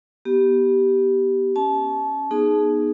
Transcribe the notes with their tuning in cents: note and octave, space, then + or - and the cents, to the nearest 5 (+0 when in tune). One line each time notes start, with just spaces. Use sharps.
B3 -15 G4 -10
C#4 +0 A5 -25
B3 -25 D#4 -10 G#4 +0